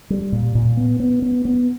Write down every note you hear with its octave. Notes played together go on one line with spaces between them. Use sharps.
G3
A#2
A#2
B3
B3
B3
B3